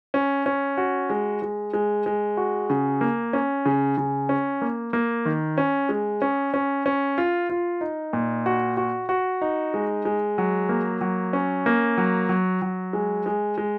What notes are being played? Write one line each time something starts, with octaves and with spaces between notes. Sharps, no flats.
C#4
C#4
F#4
G#3
G#3
G#3
G#3
F#4
C#3
A#3
C#4
C#3
C#3
C#4
A#3
A#3
D#3
C#4
G#3
C#4
C#4
C#4
F4
F4
D#4
A#2
F#4
F#4
F#4
D#4
G#3
G#3
F#3
A#3
F#3
C#4
A#3
F#3
F#3
F#3
G#3
G#3
G#3